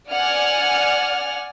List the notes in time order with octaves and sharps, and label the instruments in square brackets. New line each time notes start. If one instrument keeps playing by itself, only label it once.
[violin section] D5 F#5 G#5 F6